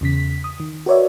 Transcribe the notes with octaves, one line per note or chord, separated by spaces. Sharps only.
E2 C#3 B6
D#6
D#3
F#4 A#4 B4 C#5 D5 E5